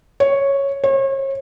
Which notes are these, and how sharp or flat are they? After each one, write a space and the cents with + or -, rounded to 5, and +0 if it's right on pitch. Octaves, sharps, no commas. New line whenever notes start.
C#5 -5
C#5 -40